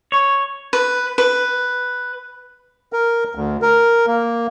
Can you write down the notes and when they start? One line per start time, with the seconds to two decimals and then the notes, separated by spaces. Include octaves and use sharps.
0.12 C#5
0.73 B4
1.18 B4
2.93 A#4
3.35 D2
3.62 A#4
4.07 A#3